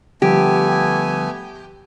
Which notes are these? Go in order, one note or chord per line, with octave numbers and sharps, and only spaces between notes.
D3 F3 G3 A3 B3 G4 G#5